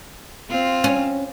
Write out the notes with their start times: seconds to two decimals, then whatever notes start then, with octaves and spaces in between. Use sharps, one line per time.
0.50 C4 F4
0.84 C#4